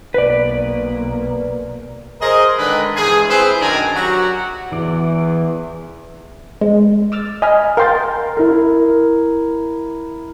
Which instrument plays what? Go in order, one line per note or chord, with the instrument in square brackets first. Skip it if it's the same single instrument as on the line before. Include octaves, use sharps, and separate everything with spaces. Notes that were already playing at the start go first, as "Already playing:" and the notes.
[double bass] B1 A#3 [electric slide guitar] B4 D5
[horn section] G#4 A#4 C5 D#5
D3 D#3 G#3 D4 G#4 B4
G2 E3 G#3 G#4
C4 E4 G#4 B4 C5
F#2 D#3 D4 D5 G#5 A#5
F#3 F#4 G4
[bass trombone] E2 [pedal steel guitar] E3 D5
[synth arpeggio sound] G#3
D6 E6 F6 A6
D#5 G#5 A#5 B5 F6
A#4 F5 G5 C6 G6 A6
[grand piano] E4 A#4